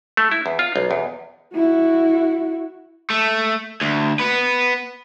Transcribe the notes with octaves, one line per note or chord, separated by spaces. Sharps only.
A3
E4
E2
F4
B1
E2
E4 F#4
A3
D2
B3 B4